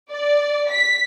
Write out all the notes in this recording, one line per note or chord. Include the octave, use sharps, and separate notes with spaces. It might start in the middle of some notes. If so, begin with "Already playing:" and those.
D5
B6